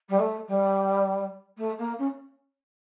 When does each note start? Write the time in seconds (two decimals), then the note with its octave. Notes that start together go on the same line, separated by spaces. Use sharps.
0.09 G3
0.19 A3
0.47 G3
1.57 A3
1.78 A#3
1.98 C#4